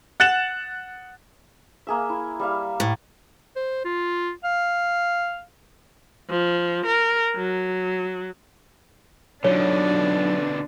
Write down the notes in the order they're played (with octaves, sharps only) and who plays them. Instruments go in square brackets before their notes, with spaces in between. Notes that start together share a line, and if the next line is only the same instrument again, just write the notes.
[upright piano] F#5 F#6 A6 C#7 E7 F#7
[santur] A#3 G#4 E5
E4
G3 E5 F5
[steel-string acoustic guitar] A2
[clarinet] C5
F4
F5
[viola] F3
A#4
F#3
[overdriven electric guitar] B2 D3 [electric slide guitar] F#3 D#4 F4 [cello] D4 [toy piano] C#5